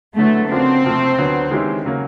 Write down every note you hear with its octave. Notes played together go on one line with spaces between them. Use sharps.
D3 F#3 A3 B3 E4
C#3 F3 A#3 C4 D4 F#4
C3 F3 A3
D2 D3 F#3 B3
D#3 G#3 C#4 E4 G4
C#3 F#3 A#3